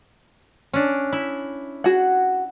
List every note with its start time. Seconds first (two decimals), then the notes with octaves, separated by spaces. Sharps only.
0.73 C#4 D4
1.12 E4
1.84 F#4 G#4 F#5